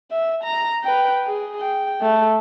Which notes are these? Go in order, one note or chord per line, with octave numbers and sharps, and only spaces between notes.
E5
A#5
B4 G5
G#4
G5
A3